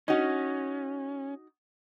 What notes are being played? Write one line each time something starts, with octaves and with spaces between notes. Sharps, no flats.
C#4 D#4 F#4